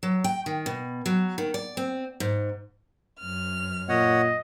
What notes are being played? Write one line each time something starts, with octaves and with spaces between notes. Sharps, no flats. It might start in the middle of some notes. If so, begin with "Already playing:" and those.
F#3
G5
D#3
B2
F#3
D#3
D5
C4
G#2
F#2 F6
A#2 C#5 D#5 F#5